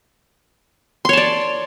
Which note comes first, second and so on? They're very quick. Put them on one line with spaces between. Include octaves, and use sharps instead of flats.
C6 C#5 A5 D5